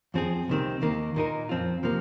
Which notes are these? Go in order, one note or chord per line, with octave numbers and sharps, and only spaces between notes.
F2 F3 C4 G#4
C2 C3 D#3 C4
D#2 D#3 A#3
A#2 A#3 D#4 A#4
F2 F3 C4 F4
C3 F3 A#3